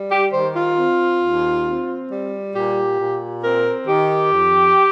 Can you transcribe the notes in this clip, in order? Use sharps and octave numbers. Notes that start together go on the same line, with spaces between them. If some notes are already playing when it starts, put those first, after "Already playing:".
Already playing: G3
G4
D#3 C5
F4
C4
D#2
C4
G3
A#2 G4
A#2
C4 A#4
D#3 G4
F2